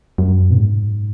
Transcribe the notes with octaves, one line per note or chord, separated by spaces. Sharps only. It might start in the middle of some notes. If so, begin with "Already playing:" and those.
F#2
B2
G#2